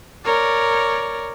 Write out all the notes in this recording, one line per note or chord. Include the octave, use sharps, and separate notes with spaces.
A#4 C#5 D5